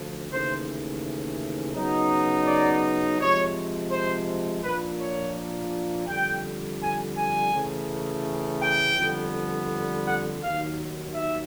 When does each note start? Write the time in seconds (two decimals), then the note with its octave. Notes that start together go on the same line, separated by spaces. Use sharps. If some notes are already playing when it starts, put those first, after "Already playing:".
Already playing: D2 D3 F3
0.30 D#2 C#3 E3 A3 C5
1.74 C#3 F#3 B3 D#4
2.47 D5
3.19 C3 F3 G#3 C#5
3.91 C5
4.63 A#2 F3 A#3 D4 B4
5.00 C#5
6.07 F2 D3 G3 G5
6.81 G#5
7.16 G#5
7.53 C#3 E3 A3
8.61 G5
8.96 F2 D3 G3 B3
10.05 F#5
10.41 D#2 D#3 F#3 F5
11.14 E5